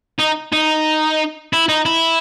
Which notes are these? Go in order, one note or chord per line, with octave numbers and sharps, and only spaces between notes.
D#4
D#4
E4
D#4
E4